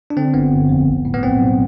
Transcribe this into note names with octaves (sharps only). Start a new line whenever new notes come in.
D4
D3 C4
G1 B3
G1
F2
B1
A2
B3
B1 C4
B1